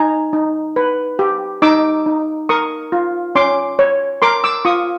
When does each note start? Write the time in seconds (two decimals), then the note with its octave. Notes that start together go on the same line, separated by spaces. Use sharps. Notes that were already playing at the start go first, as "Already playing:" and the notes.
Already playing: D#4 G#5 A#5
0.33 D#4
0.76 B4
1.19 G4
1.62 D#4 D6 E6
2.06 D#4
2.49 A#4 C#6 D#6
2.92 F4
3.35 C#4 C6 D6
3.79 C#5
4.22 A#4 C6 D6
4.44 D6 E6
4.65 F4 C#6 D#6